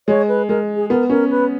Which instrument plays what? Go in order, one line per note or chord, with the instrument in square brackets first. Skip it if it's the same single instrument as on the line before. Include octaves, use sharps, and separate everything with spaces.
[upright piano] G#3 [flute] C#5
[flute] B4
[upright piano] G#3 [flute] A#4
[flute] G#4
[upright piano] B3 [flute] A#4
[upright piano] C#4 [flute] A#4
[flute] B4